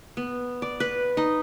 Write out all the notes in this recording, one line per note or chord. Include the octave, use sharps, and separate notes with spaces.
B3
D5
B4
D#4